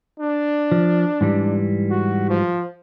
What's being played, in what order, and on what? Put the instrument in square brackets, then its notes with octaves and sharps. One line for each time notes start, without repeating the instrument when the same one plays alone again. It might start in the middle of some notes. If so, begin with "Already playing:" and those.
[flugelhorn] D4
[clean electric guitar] F3
G#2 E3 G3
[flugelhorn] F#4
F3